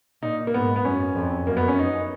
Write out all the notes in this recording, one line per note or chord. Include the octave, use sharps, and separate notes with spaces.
A#2 D#4
A#3
G#2 B3
B3
F#2 C#4
F2
F#2 A#3
B3
C#4
D#4